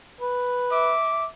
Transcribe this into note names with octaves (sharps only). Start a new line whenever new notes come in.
B4
E5 D6